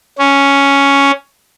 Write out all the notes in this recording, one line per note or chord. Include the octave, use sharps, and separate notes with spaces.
C#4